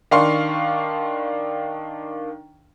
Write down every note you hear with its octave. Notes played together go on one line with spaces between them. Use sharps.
D#3 D4 F5 C6 C#6